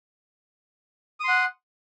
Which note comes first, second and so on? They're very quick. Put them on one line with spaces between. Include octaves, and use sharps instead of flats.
D#6 C6 F#5